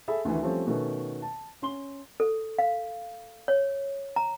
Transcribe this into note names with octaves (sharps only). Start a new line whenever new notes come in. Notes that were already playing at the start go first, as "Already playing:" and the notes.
G#4 A4 E5 B5
D2 D#3 E3
F3 G3 A3 C4 C#4
B2 D#3 A3 B3 C#4
A5
C#4 C6 G7
A4
F5
C#5
A#5